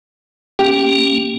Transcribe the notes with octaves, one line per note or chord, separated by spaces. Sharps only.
A#3 C#4 G4